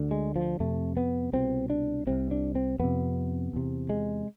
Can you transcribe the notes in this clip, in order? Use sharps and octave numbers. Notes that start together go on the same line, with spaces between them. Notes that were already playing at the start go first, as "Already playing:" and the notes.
Already playing: D2 D3
G#3
F3
F2 C3 A3
B3
C2 B2 C4
D4
C2 C3 C4
D4
C4
F2 C3 B3
E2 C3
G#3